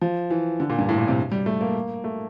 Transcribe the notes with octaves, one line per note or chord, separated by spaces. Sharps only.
F3
E3
D3
A#2
G2
A2
A#2
C3
G3
A3
A#3
A3